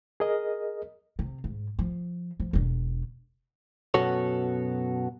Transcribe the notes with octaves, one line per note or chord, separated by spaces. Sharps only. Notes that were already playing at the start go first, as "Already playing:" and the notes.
G#4 A#4 D#5
C3
G#2
F3
F3
E1 D4
F#2 B2 B3 F#4 A4 C#5